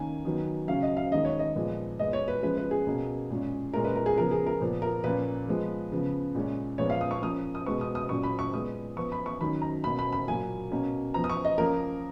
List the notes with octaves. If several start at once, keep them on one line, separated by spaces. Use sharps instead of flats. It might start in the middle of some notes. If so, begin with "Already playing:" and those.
Already playing: D#3 A#3 C#4 G#5
D#3 F#3 B3
C#3 F#3 C#4 F5
D#5
F5
D#3 G#3 C#4 D#5
C#5
D#5
A#2 F3 G#3 B3
A#2 G#3 B3 D#5
C#5
B4
F3 G#3 C#4 B4
B4
G#4
B2 A#3 C#4
A#2 G#3 C#4
A#2 G#3 C#4 A#4
B4
A#4
G#4
C#3 F3 B3 A#4
G#4
A#4
A#2 F3 B3
A#4
A#2 F3 A#3 C#4 B4
F3 G#3 B3
C#3 F3 B3
A#2 G#3 C#4
A#2 F3 G#3 B3 C#5
F5
D#6
C#6
F3 A#3 C#4 D#6
D#6
B2 G#3 B3 C#6
D#6
D#6
A#2 F#3 C#4 C#6
B5
C#6
A#2 G#3 B3 D#6
F3 B3 C#6
B5
C#6
D#3 F#3 C#4 B5
A#5
B2 A#3 C#4 B5
B5
B5
A#2 F#3 A#3 G#5
B2 A#3 C#4
F3 B3 A#5
D#6
C#6
D#5
F3 A#3 C#4 A#4